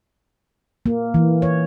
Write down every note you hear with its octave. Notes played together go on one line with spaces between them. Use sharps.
A#3
E3
C#5